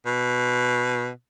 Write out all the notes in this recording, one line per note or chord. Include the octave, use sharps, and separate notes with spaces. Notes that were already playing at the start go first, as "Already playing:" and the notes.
B2